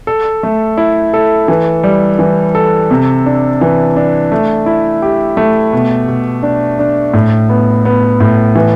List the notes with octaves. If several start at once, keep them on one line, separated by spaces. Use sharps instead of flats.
A4
A3
E4
A4
E3
G3
E3
A4
C3
D4
E3
D4
A3
E4
G4
A3
B2
B2
D4
D4
A2
B3
B3
A2
E3